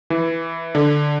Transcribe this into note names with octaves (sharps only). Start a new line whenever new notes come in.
E3
D3